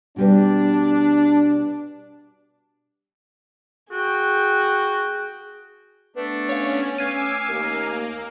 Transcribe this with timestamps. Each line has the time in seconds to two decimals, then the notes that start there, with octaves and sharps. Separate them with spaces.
0.16 B2 G3 D4 B4
3.91 F#4 G#4 G5
6.16 A3 B3 D4
6.49 C#4 C#5 F5
6.98 A3 F5 G#5 D6 E6 G#6 D#7
7.49 D#2 A#3